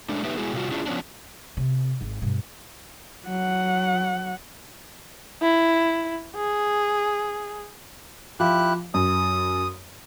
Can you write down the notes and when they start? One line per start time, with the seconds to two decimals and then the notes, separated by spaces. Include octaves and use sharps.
0.09 G#3 A3 D4
0.24 A3 B3 D#4 G4 B4 E5
0.37 G#3 B3 E4 F#4 G#4
0.54 C3 F#3 G3 A3 F4 F#4
0.72 C#4 D4 E4 F4 G#4
0.86 F3 B3 C#4 D4
1.57 C3
2.01 G#1
2.21 G2 B2
3.26 F#3 F#5
5.42 E4
6.36 G#4
8.40 F3 E4 G4 F#6
8.94 F#2 D#6